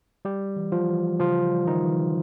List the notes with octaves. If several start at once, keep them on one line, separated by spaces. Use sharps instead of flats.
G3 G4
E3
F3 F4
E3
C#3 F3 F4
G3
D#3 D#4
E3